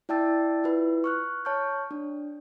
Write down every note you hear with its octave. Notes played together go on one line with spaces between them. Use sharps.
E4 D5 G5 A5 E6 A6
E4 F4 B4
C#6 F6 F#6
C#5 A5 C#6 F6 G6
D4